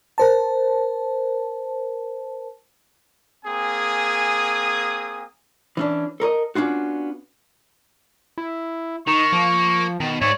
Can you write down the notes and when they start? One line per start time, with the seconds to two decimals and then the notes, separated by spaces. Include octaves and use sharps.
0.18 A#4 C5 A5
3.45 A#3 C4 G#4 G#5 D#6
5.77 E3 C#4 D4
6.20 A4 A#4 C#5 D#5
6.55 B3 C#4 D4 F4 F#4
8.38 E4
9.07 D#3 D#4 C#6
9.32 F3 A#3
10.00 B2 D#3
10.21 G#2 C#5 D5 E5